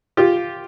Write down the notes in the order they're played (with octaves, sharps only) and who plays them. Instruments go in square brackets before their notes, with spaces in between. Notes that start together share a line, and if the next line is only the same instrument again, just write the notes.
[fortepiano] F4 G4